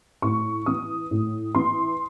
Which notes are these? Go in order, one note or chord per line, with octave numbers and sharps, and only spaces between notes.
A2 C#6
E3 D#6
A2
E3 C6